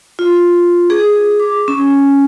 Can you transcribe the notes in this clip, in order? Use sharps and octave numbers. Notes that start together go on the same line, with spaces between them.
F4
G#4
D6
C#4